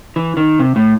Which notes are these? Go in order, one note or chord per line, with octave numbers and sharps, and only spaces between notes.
E3
D#3
C3
A2